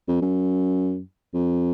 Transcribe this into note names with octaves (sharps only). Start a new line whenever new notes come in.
F2
F#2
F2